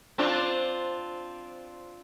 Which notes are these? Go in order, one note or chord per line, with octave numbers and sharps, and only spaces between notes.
C4 D4 F4